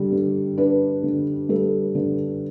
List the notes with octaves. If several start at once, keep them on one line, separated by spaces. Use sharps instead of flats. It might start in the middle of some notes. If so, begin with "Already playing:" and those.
Already playing: D3 G3
D3
D4 B4
D3
G3 A4
D3